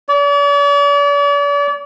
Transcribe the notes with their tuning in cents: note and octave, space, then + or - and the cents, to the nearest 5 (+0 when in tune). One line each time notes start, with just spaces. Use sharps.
D5 -45